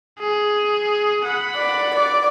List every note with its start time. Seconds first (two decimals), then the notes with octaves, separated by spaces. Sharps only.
0.19 G#4
1.25 F#5 B5
1.56 D5
1.95 D5